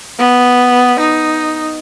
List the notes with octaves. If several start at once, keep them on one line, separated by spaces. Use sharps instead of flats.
B3
D#4